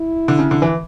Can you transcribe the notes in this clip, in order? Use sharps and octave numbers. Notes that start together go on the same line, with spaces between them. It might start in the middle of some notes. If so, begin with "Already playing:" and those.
Already playing: E4
D3
C#3
D3
E3